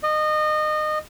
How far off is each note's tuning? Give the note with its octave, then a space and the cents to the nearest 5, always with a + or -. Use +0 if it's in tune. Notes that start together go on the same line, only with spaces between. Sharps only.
D#5 -25